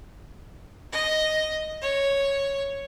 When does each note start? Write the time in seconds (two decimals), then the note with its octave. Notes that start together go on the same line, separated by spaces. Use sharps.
0.92 D#5
1.82 C#5